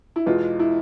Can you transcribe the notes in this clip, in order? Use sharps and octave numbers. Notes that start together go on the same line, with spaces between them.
E4
E2 B2 G#3 F4
E4